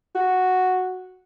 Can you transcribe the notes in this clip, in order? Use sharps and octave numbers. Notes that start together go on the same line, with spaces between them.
F#4